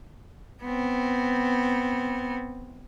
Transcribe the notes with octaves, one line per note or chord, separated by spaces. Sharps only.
B3 C4